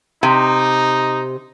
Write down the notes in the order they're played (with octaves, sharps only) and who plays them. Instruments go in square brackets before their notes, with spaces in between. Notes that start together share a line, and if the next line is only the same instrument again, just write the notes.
[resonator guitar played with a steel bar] C3 [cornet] D#4